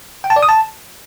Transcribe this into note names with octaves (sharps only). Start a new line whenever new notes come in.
G5
A5
D5
D#6
A5